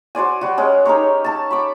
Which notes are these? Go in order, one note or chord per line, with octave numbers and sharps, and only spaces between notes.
F#4 C5 D5 G#5
G3 F#4
G#3 C#4 D6
D#4 G4 A#4 C#5
A4 A5
B5 C#6 D6